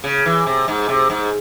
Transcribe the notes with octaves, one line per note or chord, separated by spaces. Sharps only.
C#3
E3
C3
G#2
C3
G#2